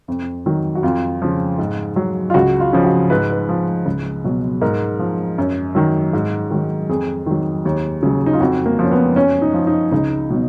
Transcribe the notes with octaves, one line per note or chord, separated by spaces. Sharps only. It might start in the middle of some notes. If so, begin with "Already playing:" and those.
F2
D#3 F#3
F#4
F2 F4
C#3 F3
G#2
F#3
F4
C#2 F#4
F4
C#3 F3
F#4
G#2 B4
B4
F3
C#2
B2 F#3
G#2 A#4
F3
F#2
D#3 F#3
G#2
D#3 F#3
F2 G#4
D#3 F#3
D#2
C#3 F#3
D#4
F4
F2 F#4
A#3
F3
C#4
B3
F#2 C#4
D#4
F3
D#4
C#2 D#4
B2 F#3